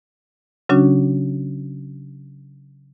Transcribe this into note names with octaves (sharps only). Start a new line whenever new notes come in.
C#3 F#3 C#4 D4 F#4